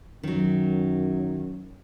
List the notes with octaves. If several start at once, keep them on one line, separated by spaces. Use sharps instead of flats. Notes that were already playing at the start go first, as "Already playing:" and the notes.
F#2 D#3 F#3